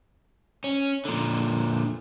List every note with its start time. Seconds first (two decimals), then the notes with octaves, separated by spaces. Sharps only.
0.64 C#4
1.05 A#2 D3